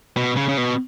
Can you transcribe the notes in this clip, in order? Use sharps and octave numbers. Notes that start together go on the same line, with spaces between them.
B2
C#3
C#3
B2